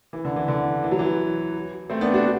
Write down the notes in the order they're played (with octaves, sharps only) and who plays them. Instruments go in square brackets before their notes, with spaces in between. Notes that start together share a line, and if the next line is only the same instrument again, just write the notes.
[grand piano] E3
D3
E3
D3
E3
F#3
E3
A3 C4
B3 D4
D4 F#4